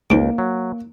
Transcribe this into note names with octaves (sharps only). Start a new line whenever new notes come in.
C#2 G#2 A#3 D6
F#3